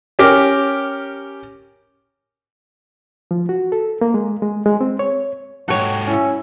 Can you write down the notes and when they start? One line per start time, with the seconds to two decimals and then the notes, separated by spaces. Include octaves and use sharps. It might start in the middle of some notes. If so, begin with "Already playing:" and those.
0.19 C#4 G4 A#4
3.31 F3
3.49 F#4
3.72 A4
4.01 A#3
4.14 G#3
4.42 G#3
4.66 G#3
4.81 C4
4.99 C#5
5.68 G#2 F#4 A4 C#5 G5
6.07 C#4 E4